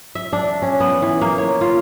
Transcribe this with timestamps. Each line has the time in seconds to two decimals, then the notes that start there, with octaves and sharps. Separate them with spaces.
0.15 E5
0.33 D4
0.62 C#4
0.80 B3
1.02 E3
1.22 A#3
1.38 C#5
1.61 F4